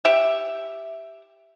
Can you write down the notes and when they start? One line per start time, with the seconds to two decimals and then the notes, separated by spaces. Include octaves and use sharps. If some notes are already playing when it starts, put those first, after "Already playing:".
0.05 G4 E5